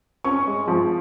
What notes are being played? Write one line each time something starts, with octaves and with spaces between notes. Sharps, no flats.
C#4 C#6
G#3
F3